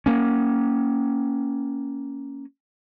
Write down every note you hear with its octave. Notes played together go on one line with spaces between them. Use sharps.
A#3 C#4